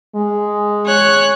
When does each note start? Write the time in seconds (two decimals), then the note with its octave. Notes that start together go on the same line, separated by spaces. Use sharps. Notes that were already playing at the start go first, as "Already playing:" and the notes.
0.16 G#3
0.86 C#5 F#6